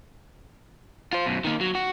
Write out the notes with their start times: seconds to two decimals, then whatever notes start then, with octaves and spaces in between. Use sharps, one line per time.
1.13 F4 C5
1.26 F#2 B2
1.44 D#3 A#3
1.61 F#3
1.75 F#4